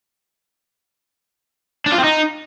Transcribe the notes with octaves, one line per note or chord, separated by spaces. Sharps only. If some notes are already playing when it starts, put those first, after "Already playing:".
D4
F4
C4
D#4